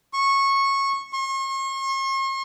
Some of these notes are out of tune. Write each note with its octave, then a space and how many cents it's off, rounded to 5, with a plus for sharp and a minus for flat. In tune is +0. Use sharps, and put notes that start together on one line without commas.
C#6 -15
C#6 -45